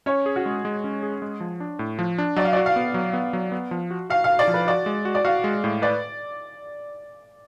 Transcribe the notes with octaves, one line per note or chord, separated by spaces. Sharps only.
C#4 C#5
G#4
F#4
G#3
G#3
C#4
G#4
G#3
F3
D4
A2
F3
D4
F#3 D5
F5
F#4 D5
F5
B3
F#3
B3
F#3
B3
F3
F#4
F#4 F5
F5
F#4
D5
F3
B4
F#4 D5
G#3
F#4
D5
F#4 F5
G#3
A2
B4 D5